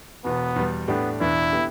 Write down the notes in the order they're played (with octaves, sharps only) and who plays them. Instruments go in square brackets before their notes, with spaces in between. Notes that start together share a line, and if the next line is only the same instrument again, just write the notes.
[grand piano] E1 E2 B2 [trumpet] B3
[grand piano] E2 B2 G3
[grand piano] A2 A3 D4 G4 [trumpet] B3
[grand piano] E1 E2 E3 B3 D4 [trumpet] E4
[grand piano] D3 B3 G4